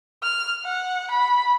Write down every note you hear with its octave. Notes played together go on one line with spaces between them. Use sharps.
F6
F#5
B5